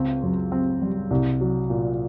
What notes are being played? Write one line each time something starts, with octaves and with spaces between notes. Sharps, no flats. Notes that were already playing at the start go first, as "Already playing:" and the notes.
Already playing: C#2 C4
F#2
C4
G3
C2
F#3
A#2